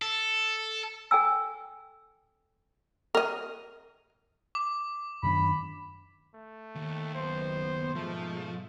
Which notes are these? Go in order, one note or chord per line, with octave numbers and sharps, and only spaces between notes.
A4
A4 G5 G#5 E6
A#4 D#5
D6
F#2 D#3 D4 B5
A3
D#2
F#1 B3 C5
G#2 B2 F3 G#3 A3